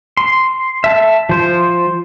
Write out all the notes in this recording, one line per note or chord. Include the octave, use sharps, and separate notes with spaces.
C6
E5 A5
F3 C5